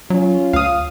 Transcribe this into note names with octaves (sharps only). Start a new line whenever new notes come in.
F#3 C#4 F4
D2 F5 D#6